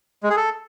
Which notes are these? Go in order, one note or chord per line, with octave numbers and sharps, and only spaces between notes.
G#3
G#4
A4